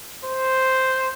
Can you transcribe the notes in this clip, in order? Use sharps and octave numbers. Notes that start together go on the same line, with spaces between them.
C5